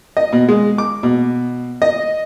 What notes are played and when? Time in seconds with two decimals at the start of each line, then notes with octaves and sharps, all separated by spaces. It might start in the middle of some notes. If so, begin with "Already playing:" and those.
0.17 D#5
0.32 B2
0.48 G#3
0.78 D6
1.03 B2
1.82 D#5